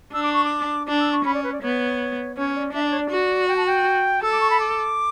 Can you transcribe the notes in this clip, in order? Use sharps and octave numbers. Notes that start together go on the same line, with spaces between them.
D4 E6
D6
C#6
D6
D4 D6
E6
C#6
C#4 B5
D5
B4
D5
B3 C#5
C#4 C#5
D5
D4 E5
D5
C#5
D5
F#4
G5
A5
G5
A4 E6
D6
C#6
B5
D6